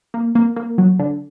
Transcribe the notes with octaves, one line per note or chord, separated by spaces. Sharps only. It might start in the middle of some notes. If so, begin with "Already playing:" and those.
A#3
A#3
A#3
F#3
D3